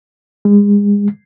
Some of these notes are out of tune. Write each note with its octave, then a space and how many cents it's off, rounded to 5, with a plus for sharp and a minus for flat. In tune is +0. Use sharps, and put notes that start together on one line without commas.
G#3 -35